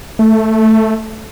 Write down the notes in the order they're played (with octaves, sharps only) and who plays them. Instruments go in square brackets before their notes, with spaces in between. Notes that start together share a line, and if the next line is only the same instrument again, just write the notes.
[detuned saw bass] A3